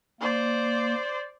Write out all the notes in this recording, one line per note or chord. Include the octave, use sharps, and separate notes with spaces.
A#3 C5 D5